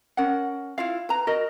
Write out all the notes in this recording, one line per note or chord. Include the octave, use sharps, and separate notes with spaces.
C#4 A#4 F#5
E4 F4 F5
B4 A#5
F#4 A#4 D#5